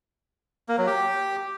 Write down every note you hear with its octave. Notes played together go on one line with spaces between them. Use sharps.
A#3
F#3
G4